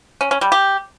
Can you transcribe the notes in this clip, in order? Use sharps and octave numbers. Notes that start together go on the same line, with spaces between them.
C#4
C#4
G3
G4